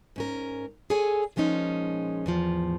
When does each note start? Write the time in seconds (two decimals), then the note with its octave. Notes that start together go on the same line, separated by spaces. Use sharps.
0.16 G#2 C#4 A#4
0.90 G#4 A4 C#5 G#5
1.36 A#2 F3 G#3 C#4 D#4
2.26 E2 A2 F3